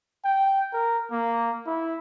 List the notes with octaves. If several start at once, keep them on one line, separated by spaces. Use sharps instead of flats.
G5
A#4
A#3
E4